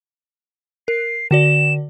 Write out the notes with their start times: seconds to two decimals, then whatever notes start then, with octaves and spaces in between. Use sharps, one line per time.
0.88 A#4 C7
1.31 D3 F#4 D5 E7